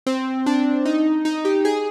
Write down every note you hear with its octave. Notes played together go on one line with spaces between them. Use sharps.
C4
D4
D#4
D#4
G4
G#4